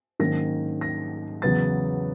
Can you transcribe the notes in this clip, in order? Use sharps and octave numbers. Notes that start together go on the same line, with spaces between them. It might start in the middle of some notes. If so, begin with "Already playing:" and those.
G#2 D#3 F#3 A#3 C#4 A#6
A#6
E2 C#3 F#3 B3 A6